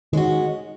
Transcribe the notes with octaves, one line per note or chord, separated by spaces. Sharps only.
D#3 G#3 C#4 F#4